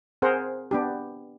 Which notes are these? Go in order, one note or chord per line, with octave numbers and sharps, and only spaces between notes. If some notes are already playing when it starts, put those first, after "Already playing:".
C4 G#4 A#4 C5 F#5
B3 D4 G4